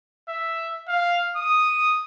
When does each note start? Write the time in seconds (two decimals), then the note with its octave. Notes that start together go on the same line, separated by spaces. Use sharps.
0.29 E5
0.88 F5
1.37 D#6